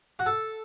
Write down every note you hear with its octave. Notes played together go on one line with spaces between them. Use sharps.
F#4
A4